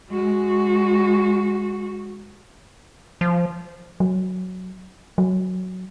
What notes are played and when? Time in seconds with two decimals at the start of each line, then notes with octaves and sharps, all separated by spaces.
0.10 G#3 F#4
3.21 F3
4.00 F#3
5.18 F#3